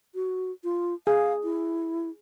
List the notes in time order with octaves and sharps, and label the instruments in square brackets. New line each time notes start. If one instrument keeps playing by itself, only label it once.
[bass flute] F#4
F4
[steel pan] G#4 [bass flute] F5
[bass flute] E4